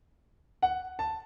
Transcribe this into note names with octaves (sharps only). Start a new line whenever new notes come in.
F#5
A5